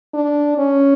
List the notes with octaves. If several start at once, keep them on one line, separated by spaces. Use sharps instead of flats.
D4
C#4